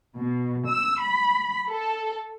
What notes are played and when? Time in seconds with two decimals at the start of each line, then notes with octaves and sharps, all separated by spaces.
0.17 B2
0.68 E6
1.01 B5
1.69 A4